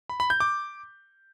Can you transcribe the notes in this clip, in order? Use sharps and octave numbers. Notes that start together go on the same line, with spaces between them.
B5
B5
G6
D6